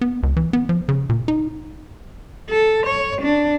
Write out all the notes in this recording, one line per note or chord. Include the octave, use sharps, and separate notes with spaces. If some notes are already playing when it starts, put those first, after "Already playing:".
B3
C#2
E3
B3
F3
C#3
A#2
D#4
A4
C#5
D4